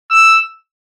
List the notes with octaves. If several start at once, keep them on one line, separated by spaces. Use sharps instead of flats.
E6